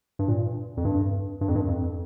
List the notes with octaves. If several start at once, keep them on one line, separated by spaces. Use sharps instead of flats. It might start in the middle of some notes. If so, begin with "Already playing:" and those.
G2
A#2
F2
G2
G2
F2
G2
F2